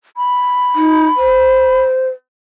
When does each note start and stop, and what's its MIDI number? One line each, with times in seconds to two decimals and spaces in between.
0.17 1.81 83
0.75 1.07 63
1.17 2.08 72